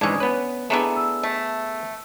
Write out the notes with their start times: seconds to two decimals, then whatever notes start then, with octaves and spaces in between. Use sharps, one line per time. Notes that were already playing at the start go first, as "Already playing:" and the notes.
0.01 G#2 E3 G#3 C#4 D4 D#6 G#6
0.20 B3 B4 C#5
0.70 A3 B3 D4 E4 G#4 A4 A#5
0.96 E6
1.23 A3